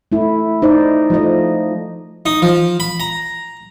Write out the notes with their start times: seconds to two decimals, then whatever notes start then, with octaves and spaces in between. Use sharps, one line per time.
0.12 A3 E4
0.62 D#4 C5 D5
1.10 F3 A3 D#5
2.26 D#4
2.42 F3
2.80 B5
3.00 A#5